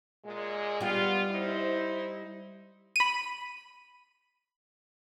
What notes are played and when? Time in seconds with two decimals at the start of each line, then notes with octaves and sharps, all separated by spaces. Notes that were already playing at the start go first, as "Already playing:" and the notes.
0.24 A#2 G#3
0.81 G3 B3 F4 G4
1.30 D#4 E4 C5
2.96 B5 D#7